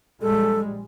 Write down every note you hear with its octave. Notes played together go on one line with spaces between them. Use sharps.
A#1 G3 G#3 A4